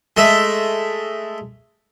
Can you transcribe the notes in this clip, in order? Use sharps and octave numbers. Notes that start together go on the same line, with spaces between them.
G#3 A3 E5